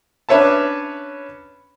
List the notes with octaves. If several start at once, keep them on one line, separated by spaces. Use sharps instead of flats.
C#4 D4 B4 C#5 E5 A5